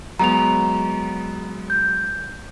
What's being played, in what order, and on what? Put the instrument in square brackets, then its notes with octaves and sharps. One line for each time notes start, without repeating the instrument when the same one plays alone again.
[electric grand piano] F#3 G#3 B3 [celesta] A#5 F7
[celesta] G6